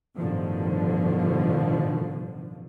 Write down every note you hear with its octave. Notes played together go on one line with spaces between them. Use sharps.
A1 G2 B2 D3 D#3 F3